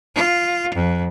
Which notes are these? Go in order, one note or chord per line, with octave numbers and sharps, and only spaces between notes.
F4
F2